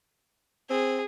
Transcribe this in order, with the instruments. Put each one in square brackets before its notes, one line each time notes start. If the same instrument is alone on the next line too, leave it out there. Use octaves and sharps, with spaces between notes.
[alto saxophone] C4 [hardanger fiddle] G#4